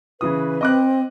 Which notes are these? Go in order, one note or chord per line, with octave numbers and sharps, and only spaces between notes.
C#3 E3 B4 D#6
C4 D#5 D6 F#6